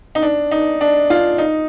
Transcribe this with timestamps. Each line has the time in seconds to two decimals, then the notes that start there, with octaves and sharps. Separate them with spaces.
0.15 D#4
0.22 D4
0.51 D#4
0.81 D4
1.10 F4
1.38 D#4